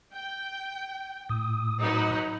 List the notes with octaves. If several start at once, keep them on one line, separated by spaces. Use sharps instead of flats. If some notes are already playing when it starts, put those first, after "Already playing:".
G5
A2 D#6
F#3 D#4 B4